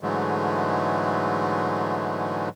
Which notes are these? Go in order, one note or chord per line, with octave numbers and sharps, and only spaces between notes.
G#2 D3 E3 F#3 G#3 A3